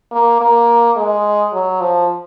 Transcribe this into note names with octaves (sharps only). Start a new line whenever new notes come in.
A#3
A#3
G#3
F#3
F3